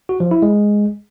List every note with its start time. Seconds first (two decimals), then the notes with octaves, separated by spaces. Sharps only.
0.09 F#4
0.20 F3
0.31 E4
0.42 G#3